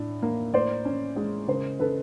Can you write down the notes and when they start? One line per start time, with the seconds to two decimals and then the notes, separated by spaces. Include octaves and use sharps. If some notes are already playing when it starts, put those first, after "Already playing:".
Already playing: A2 D4
0.22 A#3
0.53 A2 C5 D5
0.85 C#4
1.16 G#3
1.48 C#3 A#4 C5
1.79 C#3 A4 B4